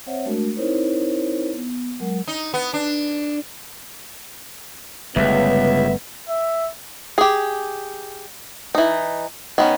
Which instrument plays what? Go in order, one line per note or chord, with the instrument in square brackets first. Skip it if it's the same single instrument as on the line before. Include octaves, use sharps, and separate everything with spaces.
[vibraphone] C4 C5 C#5 E5 F#5
G#3 A3 D4 F#4 A#4
C4 D#4 E4 A#4 C5 C#5
B3
F#3 G#3 A#4 F#5
[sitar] D#4
B3
D4
[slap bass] G1 G3 A3 [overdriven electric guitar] C#2 [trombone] B3 [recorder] E5
[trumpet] E5
[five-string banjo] G4 G#4
E3 D#4
D#3 B3 C#4